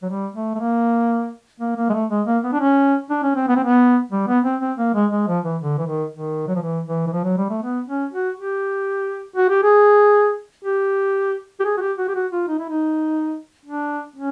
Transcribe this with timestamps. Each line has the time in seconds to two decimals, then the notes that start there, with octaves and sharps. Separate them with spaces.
0.02 F#3
0.09 G3
0.34 A3
0.55 A3
0.59 A#3
1.60 A#3
1.77 A#3
1.89 G#3
1.93 A3
2.10 G#3
2.27 A#3
2.44 B3
2.52 D4
2.60 C#4
3.10 D4
3.23 C#4
3.36 C4
3.48 B3
3.56 C4
3.64 B3
4.12 G3
4.28 B3
4.45 C4
4.61 C4
4.78 A#3
4.94 G#3
5.12 G#3
5.28 F3
5.44 E3
5.62 D3
5.78 E3
5.86 D#3
6.12 D#3
6.48 F#3
6.55 F3
6.62 E3
6.87 E3
7.07 E3
7.13 F3
7.24 F#3
7.37 G3
7.50 A3
7.62 B3
7.88 C#4
8.13 F#4
8.38 G4
9.36 F#4
9.49 G4
9.63 G#4
10.64 G4
11.60 G4
11.65 G#4
11.77 F#4
11.81 G4
11.98 F#4
12.08 G4
12.15 F#4
12.32 F4
12.48 D#4
12.59 E4
12.69 D#4
13.66 D4
14.16 C#4